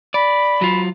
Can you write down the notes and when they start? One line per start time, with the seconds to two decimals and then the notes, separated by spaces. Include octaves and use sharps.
0.14 D5 B5
0.61 F#3 F4